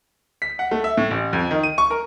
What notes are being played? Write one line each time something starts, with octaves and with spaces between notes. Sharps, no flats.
B6
F#5
A3
E5
A2
A1
F2
D#3
D#7
C#6
A#4